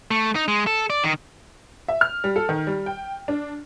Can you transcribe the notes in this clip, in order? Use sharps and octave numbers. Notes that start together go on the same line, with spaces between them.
A3
D#4
G#3
A4
D5
D#3
E5
F6
G3
A4
D#3
G3
G5
D4